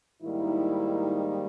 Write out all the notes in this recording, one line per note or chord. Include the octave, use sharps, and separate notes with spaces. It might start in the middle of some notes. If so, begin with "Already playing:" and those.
G#2 D#3 G3 A#3 D#4 E4